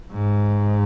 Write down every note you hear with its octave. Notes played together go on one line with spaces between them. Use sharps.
G#2